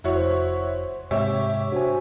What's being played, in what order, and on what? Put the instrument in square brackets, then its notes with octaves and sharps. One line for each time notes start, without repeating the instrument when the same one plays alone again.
[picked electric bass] F1 [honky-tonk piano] E4 F#4 C#5
[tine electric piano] C5
[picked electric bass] G#2 [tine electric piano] C3 [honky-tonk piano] G4 C#5 E5
[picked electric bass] D4 [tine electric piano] F#4 C5 G#5